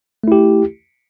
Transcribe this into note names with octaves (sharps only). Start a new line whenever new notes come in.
A3 E4 G4